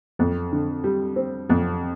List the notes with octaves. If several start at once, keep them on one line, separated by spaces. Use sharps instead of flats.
F2
D3
G3
C4
F2